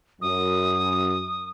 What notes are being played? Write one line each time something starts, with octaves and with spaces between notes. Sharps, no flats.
F#2 D#6